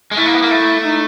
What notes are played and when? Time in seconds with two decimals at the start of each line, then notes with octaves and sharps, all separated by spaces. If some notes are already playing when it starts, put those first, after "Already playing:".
0.11 G#3
0.17 A3 E4
0.26 A#3
0.34 B3
0.42 A#3
0.51 A3
0.84 D#4